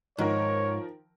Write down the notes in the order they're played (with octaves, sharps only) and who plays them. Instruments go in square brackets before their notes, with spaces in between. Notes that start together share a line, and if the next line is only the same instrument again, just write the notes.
[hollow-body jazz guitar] G#2 [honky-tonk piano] D#3 F3 A#4 [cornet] C#5